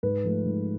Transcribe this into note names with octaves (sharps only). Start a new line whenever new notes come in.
G#2 B4
F3 A3
G#2